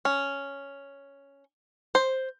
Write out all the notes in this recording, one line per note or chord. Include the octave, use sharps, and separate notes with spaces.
C#4
C5